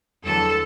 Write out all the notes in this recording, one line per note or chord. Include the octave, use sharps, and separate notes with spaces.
E2 D3 F#3 A4